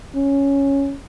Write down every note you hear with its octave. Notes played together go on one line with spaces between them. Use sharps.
C#4